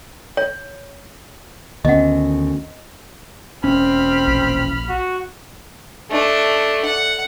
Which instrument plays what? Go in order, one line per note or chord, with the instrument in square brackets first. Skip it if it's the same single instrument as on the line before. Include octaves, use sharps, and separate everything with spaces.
[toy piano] C#5
[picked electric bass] D2 [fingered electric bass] D#3 B3 C#4 [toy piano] D#5 F#5
[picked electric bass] E1 C#4 [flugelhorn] C4 [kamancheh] B5 F6
[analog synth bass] A#1
[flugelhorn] F#4
[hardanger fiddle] A3 D4
F#5